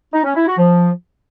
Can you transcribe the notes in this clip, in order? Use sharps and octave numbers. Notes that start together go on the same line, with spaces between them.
D#4
C#4
E4
F#4
F3